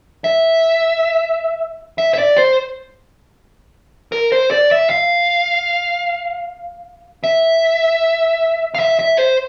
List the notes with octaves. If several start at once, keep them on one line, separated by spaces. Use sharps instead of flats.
E5
E5
E5
D5
C5
A#4
C5
D5
E5
F5
E5
F5
E5
E5
C5